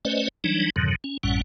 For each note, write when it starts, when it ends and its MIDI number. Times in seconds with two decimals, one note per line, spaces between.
0.05 0.28 57
0.05 0.28 61
0.05 0.28 71
0.05 0.28 72
0.05 0.28 74
0.05 0.28 75
0.44 0.70 52
0.44 0.70 54
0.44 0.70 55
0.44 0.70 62
0.44 0.70 63
0.76 0.95 41
0.76 0.95 44
0.76 0.95 47
0.76 0.95 50
0.76 0.95 51
0.76 0.95 54
1.04 1.18 61
1.23 1.41 33
1.23 1.41 42
1.23 1.41 45
1.23 1.41 55
1.23 1.41 61
1.23 1.41 78